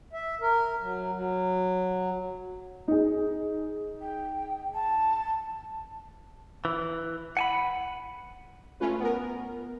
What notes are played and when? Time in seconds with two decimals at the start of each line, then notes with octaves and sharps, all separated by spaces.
0.13 E5
0.41 A#4
0.81 F#3
1.13 F#3
2.88 D#4 G#4
4.01 G5
4.74 A5
6.65 E3
7.37 F#5 G#5 B5
8.80 A3 C#4 F4 B4
9.00 B3 A#4